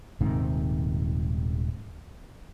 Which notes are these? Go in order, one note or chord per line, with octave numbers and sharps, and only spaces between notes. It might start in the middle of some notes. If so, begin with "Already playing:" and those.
D#1 G#2 C3 D#3